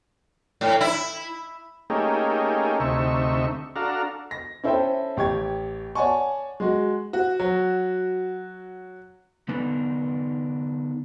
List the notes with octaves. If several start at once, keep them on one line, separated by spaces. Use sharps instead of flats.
A2
E4
A3 A#3 C#4 D#4 G4 G#4
D2 C3 A3 D#4 E5 C#6
D4 F#4 A4 F5 A#5
A#6
C#4 E4 A4 C5 E5 G5
A1 G4 C#6 G#6
C#5 D5 F#5 G#5 A5 C#6
G#3 F#4
F#4
F#3
D3 B3 D4 D#4 A4 B4